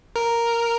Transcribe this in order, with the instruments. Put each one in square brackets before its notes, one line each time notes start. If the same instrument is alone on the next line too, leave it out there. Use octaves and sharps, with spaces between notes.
[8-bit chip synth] A#4